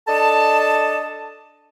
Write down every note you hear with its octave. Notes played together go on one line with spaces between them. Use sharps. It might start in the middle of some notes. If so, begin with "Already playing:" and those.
D4 A4 D#5 A5